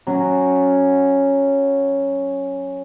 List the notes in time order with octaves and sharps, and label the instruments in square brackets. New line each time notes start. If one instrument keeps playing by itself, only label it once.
[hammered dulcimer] F#3 C#4 F#4